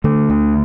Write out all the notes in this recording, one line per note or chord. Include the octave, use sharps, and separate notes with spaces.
D3 A3
D2